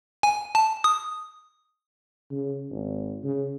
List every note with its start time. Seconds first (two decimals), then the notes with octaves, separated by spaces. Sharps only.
0.23 G#5
0.55 A5
0.84 D#6
2.31 C#3
2.71 G#1
3.24 C#3